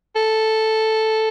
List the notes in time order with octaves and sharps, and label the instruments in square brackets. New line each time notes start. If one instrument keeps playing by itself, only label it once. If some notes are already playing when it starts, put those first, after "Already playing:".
[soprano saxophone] A4